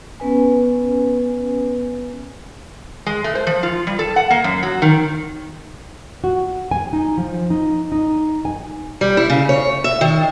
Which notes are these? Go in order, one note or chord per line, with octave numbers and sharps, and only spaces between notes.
B3 C#4 B4 G#5
G#3
A3
C5
F3
F4
G3
A4
F#5
A#3
F#2
F#3
D#3
F#4
G#5
D#4
F3
D#4
D#4
G#5
G3
E4
C#3
C#5
E5
D#3